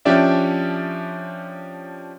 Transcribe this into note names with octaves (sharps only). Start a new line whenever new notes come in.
F3 C#4 D4 G4 D5 E5